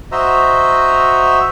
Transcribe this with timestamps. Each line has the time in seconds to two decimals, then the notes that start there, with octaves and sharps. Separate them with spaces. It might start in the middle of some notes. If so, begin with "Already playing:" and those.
0.12 F#4 C5 D#5 E5 A#5 E6